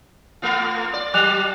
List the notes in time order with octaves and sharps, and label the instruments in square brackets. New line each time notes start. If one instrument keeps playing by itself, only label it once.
[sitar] A3 B3 F4
D5
[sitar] F#3 [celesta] D6 F#6 F7